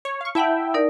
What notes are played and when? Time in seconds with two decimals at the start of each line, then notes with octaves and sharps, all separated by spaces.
0.05 C#5
0.21 F5 C#6
0.35 E4 E5 F#5 G5 A5
0.74 D#4 A#4 D5